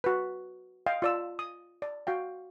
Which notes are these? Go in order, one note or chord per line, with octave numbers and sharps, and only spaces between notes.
F#4 B4
D#5 F5 G5
F4 D5 E6
D#6
D5
F#4 F5 G5